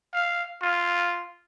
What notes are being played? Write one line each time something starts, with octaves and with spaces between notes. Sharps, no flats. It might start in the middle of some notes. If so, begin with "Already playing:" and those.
F5
F4